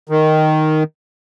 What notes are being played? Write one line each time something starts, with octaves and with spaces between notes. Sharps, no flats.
D#3